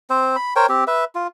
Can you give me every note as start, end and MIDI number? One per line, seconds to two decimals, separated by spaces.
0.10 0.36 60
0.10 0.36 72
0.36 0.54 83
0.56 0.66 70
0.56 0.66 72
0.56 0.66 73
0.56 0.66 79
0.69 0.84 60
0.69 0.84 67
0.87 1.04 71
0.87 1.04 76
1.15 1.27 65